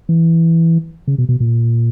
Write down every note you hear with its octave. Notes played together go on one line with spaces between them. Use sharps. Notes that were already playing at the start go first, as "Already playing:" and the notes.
E3
C#3
B2
B2
A#2